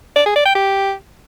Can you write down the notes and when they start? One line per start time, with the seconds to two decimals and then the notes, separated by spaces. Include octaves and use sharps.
0.16 D5
0.26 G#4
0.36 D5
0.45 G5
0.55 G4